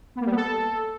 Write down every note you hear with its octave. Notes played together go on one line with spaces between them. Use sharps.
B3
A#3
G3
B3
A4